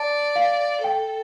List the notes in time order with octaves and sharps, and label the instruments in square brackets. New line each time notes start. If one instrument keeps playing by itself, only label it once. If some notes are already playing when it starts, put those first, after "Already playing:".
Already playing: [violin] D5 [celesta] A5
[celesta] F5
[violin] A4 [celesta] G5